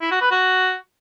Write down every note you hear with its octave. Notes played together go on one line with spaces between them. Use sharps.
E4
F#4
B4
F#4